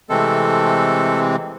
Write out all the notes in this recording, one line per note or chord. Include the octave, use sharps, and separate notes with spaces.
C3 E3 G#3 A3 C4 A4